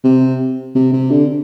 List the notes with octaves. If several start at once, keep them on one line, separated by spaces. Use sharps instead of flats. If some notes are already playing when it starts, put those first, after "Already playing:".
C3
C3
C3
D3